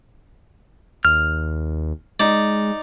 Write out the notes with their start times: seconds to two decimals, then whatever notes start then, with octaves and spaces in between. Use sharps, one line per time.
1.05 D#2 F6
2.20 G#3 D#4 D5